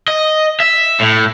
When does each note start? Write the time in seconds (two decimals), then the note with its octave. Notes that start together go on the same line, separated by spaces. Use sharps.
0.08 D#5
0.60 E5
1.00 A2